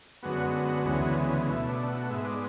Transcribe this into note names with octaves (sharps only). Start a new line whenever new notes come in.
F#2 D3 G#3 B3 F#4
D2 C#3 E3 G#3 B3
B2 A3 E4
D4
F#4
G#2 G#3 B3 E5
D5